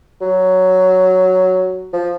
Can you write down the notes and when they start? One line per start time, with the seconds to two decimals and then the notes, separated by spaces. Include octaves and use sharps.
0.21 F#3
1.93 F3